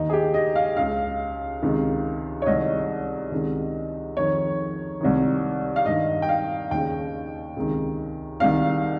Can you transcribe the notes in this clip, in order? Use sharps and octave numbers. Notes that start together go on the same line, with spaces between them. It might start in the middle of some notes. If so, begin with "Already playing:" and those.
Already playing: D#2 D#3 D#4
G#4
G4
D#5
F5
C#2 C#3 F5
C#2 C3 D#3
C#5
C2 C3 D#3 D#5
C#2 C3 D#3
F2 D#3 C#5
C2 C3 D#3
F5
G2 D#3 D#5
G5
F5
D#2 C#3 G5
C#2 C3 D#3
C2 C3 D#3 F5